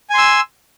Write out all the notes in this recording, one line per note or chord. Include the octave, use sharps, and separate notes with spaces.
G#5 C6 E6